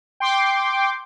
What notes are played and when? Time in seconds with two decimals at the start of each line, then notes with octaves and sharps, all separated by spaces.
0.20 G5 C6 D6